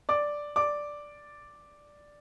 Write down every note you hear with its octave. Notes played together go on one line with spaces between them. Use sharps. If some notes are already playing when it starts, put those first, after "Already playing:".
D5 D6
D5 D6